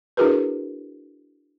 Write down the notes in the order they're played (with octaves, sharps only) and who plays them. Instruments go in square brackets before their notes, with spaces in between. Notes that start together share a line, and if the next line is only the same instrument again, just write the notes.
[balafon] D4 E4 F#4 G#4 A#4 B4